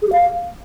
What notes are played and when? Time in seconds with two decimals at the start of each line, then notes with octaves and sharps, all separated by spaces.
0.02 G#4
0.07 G4
0.12 F5